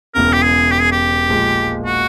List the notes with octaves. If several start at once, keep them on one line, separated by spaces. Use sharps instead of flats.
E1 E2 C#3 A#4
G4
G#4
G4
G#4
G4
A#1 A#2 F3 G#3
F#4